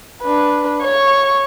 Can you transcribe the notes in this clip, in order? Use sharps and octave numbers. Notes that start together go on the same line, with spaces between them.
D4 B4
C#5 C#6